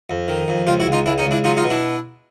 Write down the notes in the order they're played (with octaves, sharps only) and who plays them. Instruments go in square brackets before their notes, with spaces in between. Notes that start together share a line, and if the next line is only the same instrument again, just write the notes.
[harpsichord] F2
D#3
F2
C#2 F4 G4
E4 F#4
C#2
D#4 F4
C#2 D4 E4
C#4 D#4
C#2
D4 E4
F#3 D#4 F4
D#4 F4
B2
D4 E4